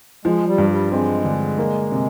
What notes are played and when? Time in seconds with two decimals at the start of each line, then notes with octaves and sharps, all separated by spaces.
0.25 F3 G#3
0.47 G3
0.58 G2
0.69 G3
0.92 G#3 C4
1.25 D3
1.58 A#3
1.92 C3